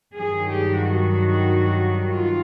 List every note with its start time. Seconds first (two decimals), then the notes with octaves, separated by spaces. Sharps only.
0.17 G2 D#3 F#3 G#4
0.49 G4
0.81 F#4
2.11 F4